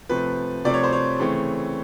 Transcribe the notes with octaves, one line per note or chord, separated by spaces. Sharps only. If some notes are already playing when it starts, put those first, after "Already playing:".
C3 F3 A3 C4 B4
C3 F3 A3 C4 D5
C#5
C5
C#5
C#3 E3 A3 C4